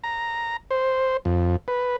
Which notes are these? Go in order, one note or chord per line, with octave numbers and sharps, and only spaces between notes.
A#5
C5
F2
B4